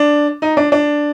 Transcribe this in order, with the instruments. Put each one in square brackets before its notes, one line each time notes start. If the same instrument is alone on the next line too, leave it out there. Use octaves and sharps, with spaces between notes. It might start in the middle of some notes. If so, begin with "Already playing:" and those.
Already playing: [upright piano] D4
D#4
D4
D4